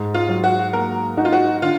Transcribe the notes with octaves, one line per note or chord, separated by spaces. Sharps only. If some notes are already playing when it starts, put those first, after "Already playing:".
Already playing: G#2
F4
F#3
F#4
A#3 A#4
D#4 F#4
F4
F#4
D3 F4